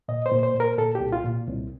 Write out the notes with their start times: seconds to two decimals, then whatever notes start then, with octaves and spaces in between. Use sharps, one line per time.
0.08 A#2 D#5
0.26 C5
0.32 A#2
0.43 C5
0.55 A#2
0.60 A#4
0.78 A#2 A4
0.95 G4
1.00 C2
1.12 F4
1.24 A#2
1.47 C2